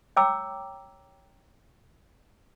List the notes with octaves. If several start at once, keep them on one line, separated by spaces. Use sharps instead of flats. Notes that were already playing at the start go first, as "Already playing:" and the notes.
C#5 G5 A#5 D6 E6